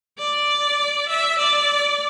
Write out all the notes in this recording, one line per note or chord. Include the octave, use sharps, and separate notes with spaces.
D5
E5
D5